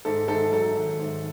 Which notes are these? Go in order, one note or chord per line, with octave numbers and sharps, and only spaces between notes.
G#2 A4
G#2 A4
F#3 A4
D#3
G#2